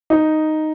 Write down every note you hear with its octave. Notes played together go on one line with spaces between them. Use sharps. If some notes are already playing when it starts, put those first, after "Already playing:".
D#4